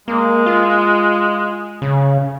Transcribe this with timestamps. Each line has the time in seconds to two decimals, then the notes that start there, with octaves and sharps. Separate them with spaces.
0.08 G#3 A#3
0.46 F4
1.82 C#3